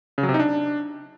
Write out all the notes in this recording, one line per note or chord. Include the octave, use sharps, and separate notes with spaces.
C#3
F#3
C3
D#4
D4